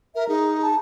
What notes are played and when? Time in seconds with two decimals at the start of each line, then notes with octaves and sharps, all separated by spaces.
0.15 A#4 E5
0.28 D#4 G#4
0.62 A5